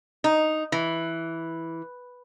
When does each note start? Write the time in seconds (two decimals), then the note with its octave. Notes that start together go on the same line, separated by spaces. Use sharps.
0.24 D#4
0.72 E3